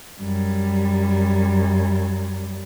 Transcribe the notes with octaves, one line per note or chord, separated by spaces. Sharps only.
F#2 G3